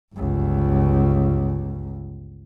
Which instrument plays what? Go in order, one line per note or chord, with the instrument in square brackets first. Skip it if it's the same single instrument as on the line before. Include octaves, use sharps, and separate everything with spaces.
[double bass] G1 C#2